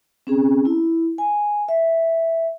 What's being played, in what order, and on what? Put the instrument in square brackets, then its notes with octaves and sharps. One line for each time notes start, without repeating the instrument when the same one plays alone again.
[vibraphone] C4 C#4 G#4
E4
G#5
E5